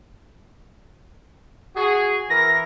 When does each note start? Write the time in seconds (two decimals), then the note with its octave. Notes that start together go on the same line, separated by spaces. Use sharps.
1.76 F#4 G#4
2.30 E3 A#4 A#6